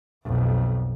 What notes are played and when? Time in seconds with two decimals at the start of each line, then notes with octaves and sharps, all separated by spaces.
0.24 B1 F2